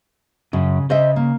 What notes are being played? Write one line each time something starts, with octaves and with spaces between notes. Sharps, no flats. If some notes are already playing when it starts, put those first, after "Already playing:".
F#2 C#3
C#3 C5 D#5 E5
A#3